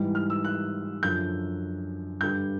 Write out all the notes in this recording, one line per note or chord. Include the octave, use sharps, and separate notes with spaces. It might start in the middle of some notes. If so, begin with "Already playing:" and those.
Already playing: G#2 E3 G3
F6
E6
F#6
F#2 D3 F3 G6
G2 D3 G3 G6